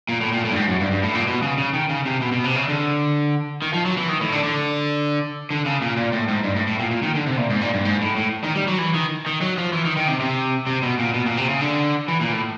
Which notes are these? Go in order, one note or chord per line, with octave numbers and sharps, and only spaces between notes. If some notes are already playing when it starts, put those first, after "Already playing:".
A#2
A2
A#2
A2
G2
G#2
F#2
G2
G2
A2
A#2
B2
C#3
C#3
D#3
C#3
C3
B2
B2
C3
C#3
D3
D#3
F3
F#3
E3
D#3
A2
D3
D3
D3
C#3
A#2
A#2
A2
G#2
G2
A2
A2
A#2
A#2
D#3
D3
C3
A#2
G#2
A#2
G2
G#2
A2
A2
D#3
G3
F#3
E3
D#3
D#3
F#3
F3
E3
D#3
D#3
C3
C3
C3
B2
A#2
B2
A#2
C3
C#3
D3
E3
A#2
A2